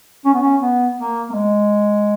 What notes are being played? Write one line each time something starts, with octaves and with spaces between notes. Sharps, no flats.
C#4
B3
C#4
B3
A#3
A#3
G#3